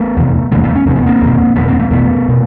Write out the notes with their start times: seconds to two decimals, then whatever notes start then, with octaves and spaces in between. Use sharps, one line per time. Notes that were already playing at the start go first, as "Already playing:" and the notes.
Already playing: A3 B3
0.17 E2 C3
0.52 E2 C3 G#3 A#3
0.63 A3 B3
0.75 C#4
0.86 E2 C3 C4
0.96 B3
1.06 A#3 C4
1.22 E2 B2
1.56 E2 B2 A3 B3
1.68 A#3 C4
1.80 A3 B3
1.91 E2 B2 A3 B3
2.29 B2